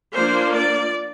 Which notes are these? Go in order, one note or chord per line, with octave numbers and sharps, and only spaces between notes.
F3 A#3 D4 C5
D5